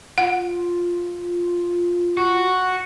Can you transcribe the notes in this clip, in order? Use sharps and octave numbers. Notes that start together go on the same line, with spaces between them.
F4 F#5
F#4